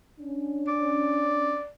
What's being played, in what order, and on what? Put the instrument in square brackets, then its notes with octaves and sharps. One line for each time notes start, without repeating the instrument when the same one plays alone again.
[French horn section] C#4 D4
[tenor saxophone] D5